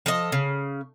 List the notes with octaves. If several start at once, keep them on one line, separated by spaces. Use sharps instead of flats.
F3 A4 D#5
C#3